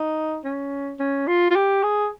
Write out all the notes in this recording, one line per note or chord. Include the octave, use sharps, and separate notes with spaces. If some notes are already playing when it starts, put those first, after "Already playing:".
Already playing: D#4
C#4
C#4
F4
F4
G4
G#4